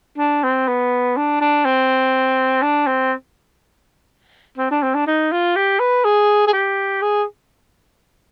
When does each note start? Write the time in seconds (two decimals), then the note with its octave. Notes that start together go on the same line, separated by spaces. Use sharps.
0.18 D4
0.43 C4
0.68 B3
1.17 D4
1.41 D4
1.65 C4
2.62 D4
2.87 C4
4.58 C4
4.71 D4
4.83 C4
4.95 D4
5.07 D#4
5.31 F4
5.56 G4
5.79 B4
6.04 G#4
6.47 G#4
6.53 G4
7.02 G#4